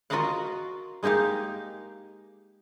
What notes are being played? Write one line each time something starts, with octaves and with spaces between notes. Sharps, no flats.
F4 F#4 A#4 D#5 F5 F#5
G#3 A#3 D#4 G4 F5